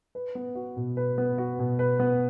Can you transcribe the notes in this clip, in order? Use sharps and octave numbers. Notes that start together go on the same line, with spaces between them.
B4
B3
F#4
B2
B4
B3
F#4
B2
B4
B3